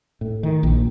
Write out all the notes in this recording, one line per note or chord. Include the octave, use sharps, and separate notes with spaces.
A2
D#3
A#1